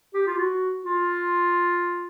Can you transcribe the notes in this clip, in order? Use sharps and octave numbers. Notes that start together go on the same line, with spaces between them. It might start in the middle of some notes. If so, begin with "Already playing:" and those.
G4
F4
F#4
F4